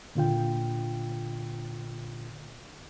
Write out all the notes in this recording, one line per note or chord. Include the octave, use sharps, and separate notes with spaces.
A#2 D3 F4 G5